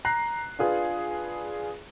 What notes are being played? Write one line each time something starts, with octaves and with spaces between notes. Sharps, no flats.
A#5 F#6 C7
D4 F4 G#4 B4